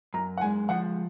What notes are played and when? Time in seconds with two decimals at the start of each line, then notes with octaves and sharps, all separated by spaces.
0.14 F#2 A#5
0.37 F#5
0.41 G#3 G#5
0.69 F3 F#5